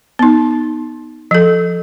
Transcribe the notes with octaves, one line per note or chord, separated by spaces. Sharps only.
B3 D#4
F3 A4